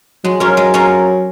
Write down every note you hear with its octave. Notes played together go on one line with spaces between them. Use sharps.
F#3 G#3
F#3 C#4 F4 A#4
G#3
C#4 F4 A#4